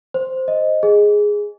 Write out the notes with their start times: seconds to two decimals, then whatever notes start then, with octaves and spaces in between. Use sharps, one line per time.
0.14 C5
0.48 D#5
0.83 G#4